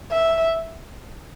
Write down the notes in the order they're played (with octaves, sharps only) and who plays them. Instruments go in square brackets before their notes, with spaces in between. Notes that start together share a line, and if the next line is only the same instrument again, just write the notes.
[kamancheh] E5